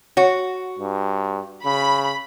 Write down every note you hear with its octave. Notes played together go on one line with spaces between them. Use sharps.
F#4 C#5
G2
C#3 B5